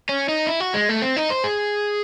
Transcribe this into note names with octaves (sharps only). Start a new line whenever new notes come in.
C#4
D#4
E4
F#4
G#3
A3
C4
D#4
C5
G#4